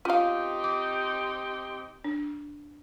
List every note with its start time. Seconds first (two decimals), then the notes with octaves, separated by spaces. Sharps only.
0.05 C4 C#4 D#4 F4 G4 F5
0.64 D6
2.04 D4